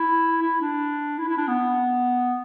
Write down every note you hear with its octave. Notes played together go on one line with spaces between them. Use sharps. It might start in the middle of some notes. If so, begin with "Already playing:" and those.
Already playing: E4
E4
D4
E4
E4
D4
B3